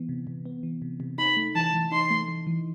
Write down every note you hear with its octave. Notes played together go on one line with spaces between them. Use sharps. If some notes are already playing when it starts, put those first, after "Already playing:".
Already playing: E3 B3
C3
C3
B3
E3
C3
C3
D#4 B5
A3
E3 A5
E3
D#4 C6
A3
E3
E3